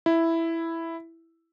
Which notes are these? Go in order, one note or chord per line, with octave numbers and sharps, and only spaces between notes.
E4